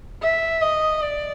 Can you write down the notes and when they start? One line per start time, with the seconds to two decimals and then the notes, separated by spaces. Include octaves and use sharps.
0.23 E5
0.62 D#5
1.02 D5